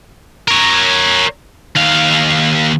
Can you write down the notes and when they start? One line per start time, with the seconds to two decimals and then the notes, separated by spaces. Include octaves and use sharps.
0.48 A#4 C#5
1.76 D#2 F5